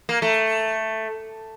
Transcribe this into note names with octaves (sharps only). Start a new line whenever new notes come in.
A#3
A3